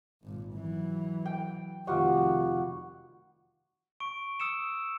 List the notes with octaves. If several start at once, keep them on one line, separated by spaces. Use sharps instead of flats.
G#1 A#2
E3 F#3
G5
F1 D#3 G3 F4 F#4
C#6 D7
D#6 E6 C#7 E7